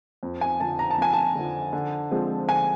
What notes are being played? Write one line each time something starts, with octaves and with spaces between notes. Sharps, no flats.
F2
G#5
D3 F3 A5
A#5
A5
F2 G#5
A5
D3 F3
D3
F3 G#3 C4
D3 G#5